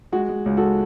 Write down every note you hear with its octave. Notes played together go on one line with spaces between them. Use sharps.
G#3 F#4
G#3
C#2
F#4 A4
G#3